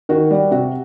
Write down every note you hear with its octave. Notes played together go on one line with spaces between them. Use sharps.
D#3 F#4
G3
C3 F#4